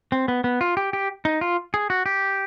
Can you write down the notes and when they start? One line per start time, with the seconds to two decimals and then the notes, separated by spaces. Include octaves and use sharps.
0.12 C4
0.28 B3
0.44 B3
0.61 F4
0.77 G4
0.93 G4
1.25 D#4
1.41 F4
1.74 G#4
1.90 F#4
2.06 G4